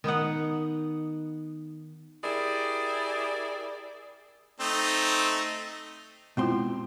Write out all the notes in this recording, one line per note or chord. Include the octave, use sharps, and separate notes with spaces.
D#3 B3 D#4 F#5
E4 G4 G#4 A#4 D5
A3 C4 D#4
B2 G#3 C4 E4 F4 C6